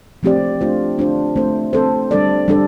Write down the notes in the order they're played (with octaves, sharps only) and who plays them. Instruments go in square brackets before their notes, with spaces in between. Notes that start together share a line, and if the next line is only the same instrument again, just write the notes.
[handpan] F3 A3 C4 G4 D5
A3 D4 F4 C5
A3 D4 F4 C5
A3 C4 A4 C5
A3 C4 A4 C5
G3 D4 A4 D5
G3 D4 A4 D5